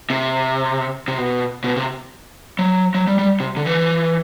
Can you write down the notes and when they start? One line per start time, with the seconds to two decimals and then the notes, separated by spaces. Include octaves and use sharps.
0.10 C3
1.08 C3
1.18 B2
1.64 B2
1.76 C3
2.59 F#3
2.94 F#3
3.07 G3
3.19 G3
3.40 C3
3.57 D3
3.66 E3